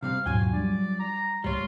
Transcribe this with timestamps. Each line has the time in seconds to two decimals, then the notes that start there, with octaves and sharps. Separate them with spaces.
0.03 C3 G3 C4 F5
0.26 D#2 G#2 B2 F#3 F4 G5 G#5
0.53 G3 D4 D5
0.99 A#5
1.44 G1 C#2 G3 G#3 F4 C#5